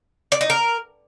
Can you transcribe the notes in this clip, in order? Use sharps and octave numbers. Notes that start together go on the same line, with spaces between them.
D5
D#4
A#4